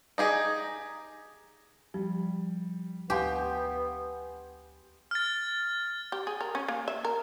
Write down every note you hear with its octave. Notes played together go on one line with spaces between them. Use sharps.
D#4 G4 G#4
F3 G3
D2 B3 G4 F5 G#5 C6 G6
F6 A6
G4
G#4
A#4
C#4
A#3
E5
A#4